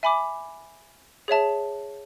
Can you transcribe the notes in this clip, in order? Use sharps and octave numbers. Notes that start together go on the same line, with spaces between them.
E5 G#5 B5 D6
G#4 C#5 E5 A5